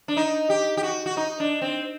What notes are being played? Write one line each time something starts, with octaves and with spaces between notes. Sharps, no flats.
D4
D#4
G4
G4
F#4
F#4
D#4
D4
C4